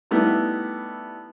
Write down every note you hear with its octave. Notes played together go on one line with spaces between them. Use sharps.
G3 A3 B3 D#4 E4